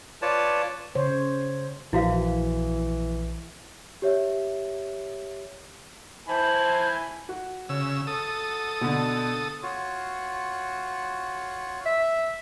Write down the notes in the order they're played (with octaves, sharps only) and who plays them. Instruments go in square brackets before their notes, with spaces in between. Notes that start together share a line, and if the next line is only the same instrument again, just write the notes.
[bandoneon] F4 B4 C#5 D5 A5
[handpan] C#3 C5 C#5
[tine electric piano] A#1 [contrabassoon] E3 [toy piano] E4 F#4 F5
[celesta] G4 C#5 E5
[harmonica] E4 G#5 B5 [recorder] C5 [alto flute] A5
[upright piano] F#4
[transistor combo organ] C#3 E6
A4 D#6
[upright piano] B2 D3
[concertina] F4 F#4 C#5
[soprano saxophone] E5